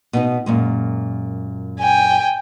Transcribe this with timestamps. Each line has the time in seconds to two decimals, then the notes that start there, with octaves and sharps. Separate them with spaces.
0.13 B2 B3 D#4
0.46 F#2 A#2 G#3
1.80 G5 G#5